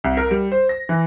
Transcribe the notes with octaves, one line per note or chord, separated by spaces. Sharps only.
C2
A#4
G3
C5
A#6
E3